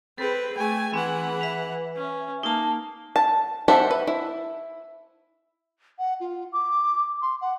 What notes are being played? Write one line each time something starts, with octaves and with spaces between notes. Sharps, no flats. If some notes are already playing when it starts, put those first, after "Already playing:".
C4 G#4 A4 B4 B5 B6
A3 G#4 G5 G#5
E3 C4 G#4 F#5
B4 E5 B6 F7
C#4
A#3 D#4 A5
A5
G4 A4 C5 E5 F#5
B4
E4
F#5
F4
D6
C6
F#5